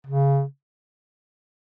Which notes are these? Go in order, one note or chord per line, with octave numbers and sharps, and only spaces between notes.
C#3